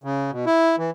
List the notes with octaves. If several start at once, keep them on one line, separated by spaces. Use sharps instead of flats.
C#3
B2
E4
E3